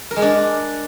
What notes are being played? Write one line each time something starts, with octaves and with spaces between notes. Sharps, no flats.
A#4
G#3
D4